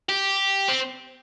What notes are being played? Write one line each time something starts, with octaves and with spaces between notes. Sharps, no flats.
G4
C4